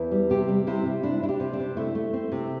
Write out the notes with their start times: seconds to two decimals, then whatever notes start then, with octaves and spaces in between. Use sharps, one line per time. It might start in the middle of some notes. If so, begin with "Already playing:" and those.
Already playing: E2 E4
0.11 G3
0.30 C3 G4
0.49 G3
0.67 C3 E4
0.86 C3
1.03 D4 E4
1.22 D4 E4
1.28 G4
1.40 C3
1.53 D4
1.59 C3
1.77 A3 E4
1.95 A3
2.13 C4
2.32 C3